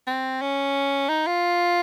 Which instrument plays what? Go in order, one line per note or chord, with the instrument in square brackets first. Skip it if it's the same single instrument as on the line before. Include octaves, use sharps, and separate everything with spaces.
[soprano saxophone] C4
C#4
D#4
F4